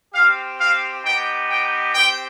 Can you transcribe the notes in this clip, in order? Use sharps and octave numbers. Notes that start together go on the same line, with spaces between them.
C4 G4 F5
F5
B3 D#4 G4 G5
G5
C4 G4 G5